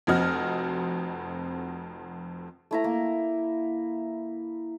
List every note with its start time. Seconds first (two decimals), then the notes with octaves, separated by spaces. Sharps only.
0.07 F1 F2 C4 F#4 D#5 F6
2.71 A3 E4 A#5
2.84 A#3